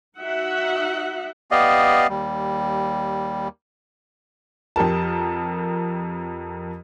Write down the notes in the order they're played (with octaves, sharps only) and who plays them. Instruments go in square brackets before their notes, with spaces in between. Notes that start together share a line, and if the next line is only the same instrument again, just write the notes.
[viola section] D#4 F#4 E5 F#5
[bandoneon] B3 G4 D5 D#5 F5
D#2 G3
[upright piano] F2 G4 A#4 A5